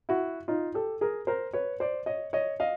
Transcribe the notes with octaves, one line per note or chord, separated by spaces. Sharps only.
E4 F#4
D#4 F4
G4 A4
G#4 A#4
A#4 C5
B4 C#5
C5 D5
C#5 D#5
C#5 D#5
D#5 F5